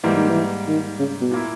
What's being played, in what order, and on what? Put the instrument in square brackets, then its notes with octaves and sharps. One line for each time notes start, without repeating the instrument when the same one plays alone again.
[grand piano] G#2 G3 A#3 [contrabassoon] E3
[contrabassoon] D#3
E3
D#3
C#3
B2
[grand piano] A#2 A#3 E4